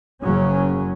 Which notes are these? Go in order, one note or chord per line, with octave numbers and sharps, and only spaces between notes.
F#1 F#2 C#3 F#3 C#4